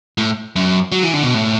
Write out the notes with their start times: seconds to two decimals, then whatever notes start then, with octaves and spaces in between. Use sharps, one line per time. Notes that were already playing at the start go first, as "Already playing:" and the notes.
0.18 A2
0.56 F#2
0.92 F#3
1.03 E3
1.13 D3
1.23 B2
1.34 A2